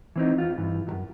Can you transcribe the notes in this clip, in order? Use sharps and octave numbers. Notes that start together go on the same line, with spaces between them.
E3 C4 D#4
E2 F4
G2 E3
B1 F#2